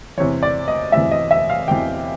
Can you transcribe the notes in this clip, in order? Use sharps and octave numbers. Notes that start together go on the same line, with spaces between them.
E2 C3 E3 C#5
D5
D#5
E2 C3 E3 E5
D#5
E5
F5
E2 C3 E3 G5